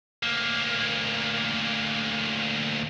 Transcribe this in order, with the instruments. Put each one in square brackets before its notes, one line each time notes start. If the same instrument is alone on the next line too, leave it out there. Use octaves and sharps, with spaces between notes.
[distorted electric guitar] D2 A#3